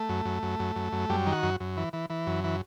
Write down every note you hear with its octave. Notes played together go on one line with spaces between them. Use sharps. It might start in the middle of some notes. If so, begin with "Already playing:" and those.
Already playing: A3
F#2
F#2
F#2
F#2
F#2
F#2
F#2 G3
D#3
F#4
F#2
F#2
E3
E3
E3
F#2
E3